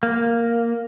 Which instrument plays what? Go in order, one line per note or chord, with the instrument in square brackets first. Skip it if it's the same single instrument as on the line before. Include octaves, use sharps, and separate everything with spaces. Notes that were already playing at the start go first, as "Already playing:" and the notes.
[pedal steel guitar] A#3